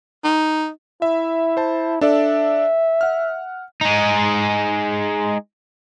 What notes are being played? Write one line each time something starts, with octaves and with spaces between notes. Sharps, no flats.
D#4
E4 E5
C5 A5
D4 A4 D5 E5
F#5 F6
G#3 D#4